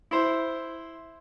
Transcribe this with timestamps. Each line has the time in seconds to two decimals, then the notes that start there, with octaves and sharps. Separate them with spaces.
0.11 E4 C5